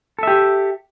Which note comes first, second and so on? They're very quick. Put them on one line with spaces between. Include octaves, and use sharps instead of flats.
A4 E5 G4